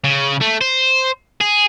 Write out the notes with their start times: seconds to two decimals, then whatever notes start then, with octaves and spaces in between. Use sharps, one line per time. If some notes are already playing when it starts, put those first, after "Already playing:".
0.04 C#3
0.41 A3
0.61 C5
1.41 G#4